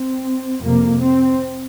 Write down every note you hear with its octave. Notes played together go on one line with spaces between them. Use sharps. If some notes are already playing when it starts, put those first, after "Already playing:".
Already playing: C4
F2 C3 A#3
C4